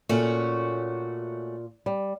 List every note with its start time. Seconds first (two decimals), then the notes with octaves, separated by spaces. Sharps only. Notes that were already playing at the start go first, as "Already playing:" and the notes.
0.09 A#2 A3 C#4 F#4
1.86 G3